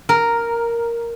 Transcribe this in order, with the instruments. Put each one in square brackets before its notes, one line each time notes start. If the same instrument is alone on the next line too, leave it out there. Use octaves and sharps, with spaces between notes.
[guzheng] A#4